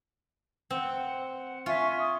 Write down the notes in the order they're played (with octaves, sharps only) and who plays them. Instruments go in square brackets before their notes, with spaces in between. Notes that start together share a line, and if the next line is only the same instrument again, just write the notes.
[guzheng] C4 [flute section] F#5
[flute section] F#5
[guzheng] F4 [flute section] E5 G#5 C#6
[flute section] D#6